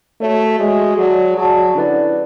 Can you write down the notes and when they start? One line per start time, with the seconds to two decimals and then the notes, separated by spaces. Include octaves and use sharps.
0.20 A3 F#4 C#5 E5
0.59 G#3 F#4 C#5 E5
0.98 F#3 G#4 D5 A5
1.37 F#3 G#4 D5 A5
1.75 D3 C#4 E4 B4 D5